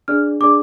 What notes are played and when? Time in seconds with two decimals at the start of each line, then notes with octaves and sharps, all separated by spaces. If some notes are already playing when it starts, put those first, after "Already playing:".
0.08 D4 G#4 D5 F6
0.40 D4 G#4 D5 D6